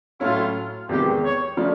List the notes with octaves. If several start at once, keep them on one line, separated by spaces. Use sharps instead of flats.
A2 F#3 A3 C#4 E4 F4
E2 C3 D#3 G#3 B3 G4
C#5
C#3 F3 A3 D4